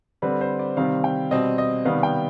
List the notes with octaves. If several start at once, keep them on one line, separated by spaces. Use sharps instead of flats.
D3 G3 C4 B4
C5
D5
C3 D#3 G3 C4 F5
G5
B2 G3 C4 D#5
D#5
C3 D#3 G3 B3 F5
G5